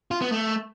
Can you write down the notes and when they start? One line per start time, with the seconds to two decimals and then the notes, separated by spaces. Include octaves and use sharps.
0.11 F4
0.22 B3
0.32 A3